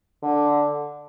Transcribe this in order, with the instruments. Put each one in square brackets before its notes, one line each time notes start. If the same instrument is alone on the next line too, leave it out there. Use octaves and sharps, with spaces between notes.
[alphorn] D3